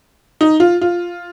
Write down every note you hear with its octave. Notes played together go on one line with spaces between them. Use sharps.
D#4
F4
F4